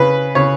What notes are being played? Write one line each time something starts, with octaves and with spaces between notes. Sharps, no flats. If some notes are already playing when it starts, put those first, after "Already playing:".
Already playing: C#3 B4
C#3 C#5